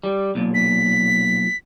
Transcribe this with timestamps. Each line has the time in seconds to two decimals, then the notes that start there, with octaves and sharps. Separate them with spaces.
0.04 G3
0.35 B1 A#2
0.54 B6